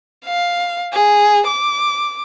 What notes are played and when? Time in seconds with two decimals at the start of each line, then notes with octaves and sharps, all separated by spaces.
0.25 F5
0.93 G#4
1.47 D6